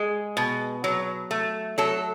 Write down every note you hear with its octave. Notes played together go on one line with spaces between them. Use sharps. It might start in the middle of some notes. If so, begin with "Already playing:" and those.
Already playing: G#3 G#4
B2
F#3
A3
F#3 A4